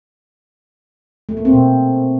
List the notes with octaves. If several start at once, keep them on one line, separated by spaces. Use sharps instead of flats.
A3
A#3
C4
B2